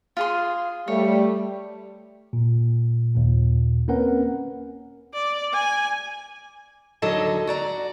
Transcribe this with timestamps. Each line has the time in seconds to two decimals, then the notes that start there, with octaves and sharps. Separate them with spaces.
0.17 F4 G#4 C6
0.88 G3 A3 C#5
2.33 A#2
3.16 D#2 A#2
3.88 A#3 C4 C#4 A#4 B4 F#5
5.14 D5
5.54 G#5
7.02 D#2 D3 F#3 A4 D#5 A5
7.47 F#4 D5 A#5